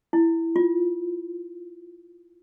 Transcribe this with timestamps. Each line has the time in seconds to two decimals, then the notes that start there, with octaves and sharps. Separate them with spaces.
0.13 E4
0.56 F4